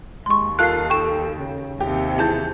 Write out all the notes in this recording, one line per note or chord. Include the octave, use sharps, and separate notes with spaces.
D#2 G#3 C6 C#6
F4 A4 A#4 F#6 C7
A4 G5 C#6 E7
C#3
D#2 C3 G4
E3 G#4 A5 G6